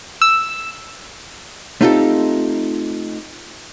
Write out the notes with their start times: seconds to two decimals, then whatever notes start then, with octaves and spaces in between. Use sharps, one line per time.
0.22 E6
1.81 A3 C4 D#4 F4 G4 A4